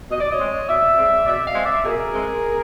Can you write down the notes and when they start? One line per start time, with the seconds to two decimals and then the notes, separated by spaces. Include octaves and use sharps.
0.10 B2 D#5
0.21 D5
0.31 C#5 D#5
0.39 G#3 C4
0.69 B2 D5 E5
0.98 G#3 C4
1.26 B2 D5 E5
1.45 D#5 F5
1.55 G#3 C4
1.65 D5 E5
1.85 B2 G#4 A#4
2.14 G#3 C4